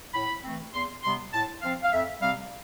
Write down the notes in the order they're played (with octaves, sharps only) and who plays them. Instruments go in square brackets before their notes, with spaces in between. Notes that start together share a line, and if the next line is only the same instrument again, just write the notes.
[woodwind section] A2 B5
E3 A3 C4
E2 C6
C3 G3 B3 C6
A2 A5
F3 C4 F5
F5
F2 E5
C3 G3 C4 F5